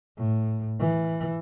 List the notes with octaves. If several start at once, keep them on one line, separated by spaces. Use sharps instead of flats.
A2
E3